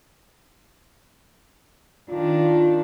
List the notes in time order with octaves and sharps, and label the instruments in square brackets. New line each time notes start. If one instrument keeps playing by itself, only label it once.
[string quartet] D#3 D4 [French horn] F4